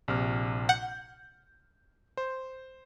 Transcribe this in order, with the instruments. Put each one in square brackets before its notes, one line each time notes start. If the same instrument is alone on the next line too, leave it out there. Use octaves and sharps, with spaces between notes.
[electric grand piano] A#1 C3 F6
[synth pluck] F#5 [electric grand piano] G6
[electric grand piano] C5